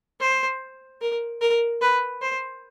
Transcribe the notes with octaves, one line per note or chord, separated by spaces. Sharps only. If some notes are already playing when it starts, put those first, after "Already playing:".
C5
A#4
A#4
B4
C5